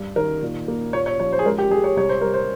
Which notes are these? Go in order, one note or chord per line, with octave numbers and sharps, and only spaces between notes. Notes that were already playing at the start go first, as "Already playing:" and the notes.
Already playing: G2
D#3 A#4
A#2
A#3
A#2 C#5
C#5
F3 C#5
C5
G#4
G#3 A#4
G4
G#3 G#4
C#5
C2 C#5
C5
G3 A#4
C5